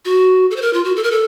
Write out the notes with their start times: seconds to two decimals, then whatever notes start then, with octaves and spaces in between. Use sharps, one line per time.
0.05 F#4
0.51 A4
0.56 C5
0.62 A#4
0.73 F4
0.84 F#4
0.96 A4
1.03 A#4
1.11 A4